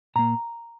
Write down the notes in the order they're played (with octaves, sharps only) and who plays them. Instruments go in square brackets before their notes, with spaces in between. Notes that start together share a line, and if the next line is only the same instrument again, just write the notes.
[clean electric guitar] A#2 A#3 A#5